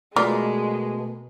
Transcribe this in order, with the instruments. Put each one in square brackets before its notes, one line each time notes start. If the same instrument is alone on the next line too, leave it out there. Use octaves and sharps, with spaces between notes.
[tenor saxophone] B2 [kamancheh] G#3 [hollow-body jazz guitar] A3 B3 A#4 [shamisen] F4 D5